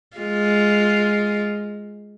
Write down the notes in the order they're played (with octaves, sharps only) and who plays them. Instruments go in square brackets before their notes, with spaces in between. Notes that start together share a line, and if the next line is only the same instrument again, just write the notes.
[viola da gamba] G#3 F4